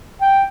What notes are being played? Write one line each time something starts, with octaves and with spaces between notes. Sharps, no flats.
G5